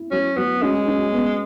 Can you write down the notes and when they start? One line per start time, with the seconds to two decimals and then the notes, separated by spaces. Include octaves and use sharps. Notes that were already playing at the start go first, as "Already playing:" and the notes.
Already playing: E4
0.11 F#3 C#4
0.37 F#3 B3
0.62 G#3 C#4
0.88 C#4
1.13 B3